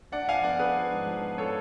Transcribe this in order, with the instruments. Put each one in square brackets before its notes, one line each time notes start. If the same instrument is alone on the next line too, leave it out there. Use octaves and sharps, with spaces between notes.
[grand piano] D4 D5 F#5
F3 F5 G#5
B3 D5 F#5
D4 G#4 B4
F3
G#2
F3
B3
F3 A4 C#5